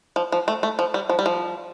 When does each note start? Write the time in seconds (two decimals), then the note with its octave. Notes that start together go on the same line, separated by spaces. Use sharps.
0.16 F3
0.32 F3
0.48 A3
0.63 A3
0.79 F3
0.94 G3
1.10 F3
1.19 G3
1.26 F3